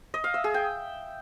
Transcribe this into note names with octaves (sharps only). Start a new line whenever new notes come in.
D#5
F5
E5
G#4
G5